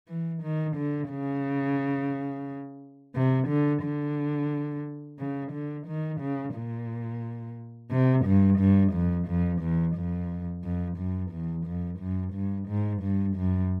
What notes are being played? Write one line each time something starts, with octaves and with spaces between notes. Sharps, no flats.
E3
D#3
D3
C#3
C3
D3
D3
C#3
D3
D#3
C#3
A#2
C3
G2
G2
F2
F2
E2
F2
F2
F#2
E2
F2
F#2
G2
G#2
G2
F#2